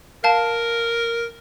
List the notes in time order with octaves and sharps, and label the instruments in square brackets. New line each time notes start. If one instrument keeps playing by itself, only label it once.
[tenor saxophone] A#4 [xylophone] F5 A5